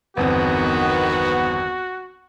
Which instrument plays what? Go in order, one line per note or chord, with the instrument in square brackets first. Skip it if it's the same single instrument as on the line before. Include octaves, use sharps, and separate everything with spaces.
[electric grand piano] G1 E2 C4 [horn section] D#3 B3 [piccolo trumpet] F#4